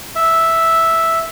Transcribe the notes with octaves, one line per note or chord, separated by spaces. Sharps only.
E5